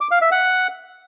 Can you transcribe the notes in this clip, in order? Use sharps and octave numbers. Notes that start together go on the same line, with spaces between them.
D6
F5
E5
F#5